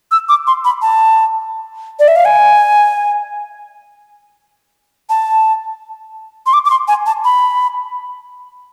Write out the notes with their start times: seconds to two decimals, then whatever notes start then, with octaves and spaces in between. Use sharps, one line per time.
0.11 E6
0.29 D6
0.47 C6
0.65 B5
0.82 A5
1.99 D5
2.08 E5
2.16 F5
2.25 G#5
5.09 A5
6.46 C6
6.53 D6
6.65 D6
6.70 C6
6.88 G#5
7.06 A5
7.24 B5